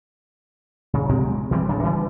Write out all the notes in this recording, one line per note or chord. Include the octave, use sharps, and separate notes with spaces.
C#3
B2 F#3 G#3 C4
E3 G3 C4
D1 C#3 D4
E3 F3 G3